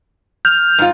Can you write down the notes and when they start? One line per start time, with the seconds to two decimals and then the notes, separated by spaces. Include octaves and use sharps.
0.45 F6 G6
0.78 G#2 F4